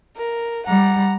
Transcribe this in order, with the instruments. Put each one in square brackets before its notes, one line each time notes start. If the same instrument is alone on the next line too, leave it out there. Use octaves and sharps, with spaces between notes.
[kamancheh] A#4
[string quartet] G3 [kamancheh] F#5 A#5